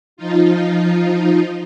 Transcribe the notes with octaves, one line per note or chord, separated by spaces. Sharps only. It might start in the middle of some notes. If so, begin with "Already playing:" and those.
F3 D#4 F4